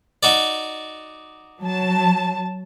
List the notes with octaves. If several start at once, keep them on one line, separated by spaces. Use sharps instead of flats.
D#4 F#4 D5
F#3 A5